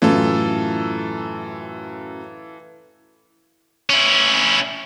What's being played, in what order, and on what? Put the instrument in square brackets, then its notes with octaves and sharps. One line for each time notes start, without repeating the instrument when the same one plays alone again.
[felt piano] F#2 A2 [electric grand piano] E3 F4 A4
[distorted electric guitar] C#4 E4